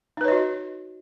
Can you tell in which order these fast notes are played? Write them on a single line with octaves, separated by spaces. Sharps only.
D#4 B4 C#5 D#5 F#4